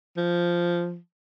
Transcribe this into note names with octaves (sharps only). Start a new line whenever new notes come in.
F3